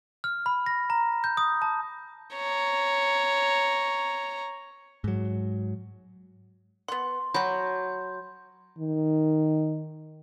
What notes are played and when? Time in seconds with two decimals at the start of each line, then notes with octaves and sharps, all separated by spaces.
0.24 F6
0.46 B5
0.66 A#6
0.90 A#5
1.24 G6
1.37 D#6
1.62 A5
2.34 C#5 A#5
5.04 G#2 F#3
6.88 B3 F#5 C6
7.34 F#3 F#4 B5 G6
8.78 D#3